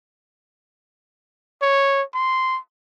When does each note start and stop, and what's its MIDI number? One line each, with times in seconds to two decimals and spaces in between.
1.62 2.03 73
2.14 2.59 84